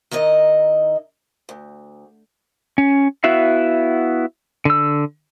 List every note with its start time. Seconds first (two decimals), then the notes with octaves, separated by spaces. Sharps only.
0.11 D#3 D#4 E4 D#5
1.49 D2
2.78 C#4
3.24 B3 E4 F#4 E5 F5
4.65 D3 E6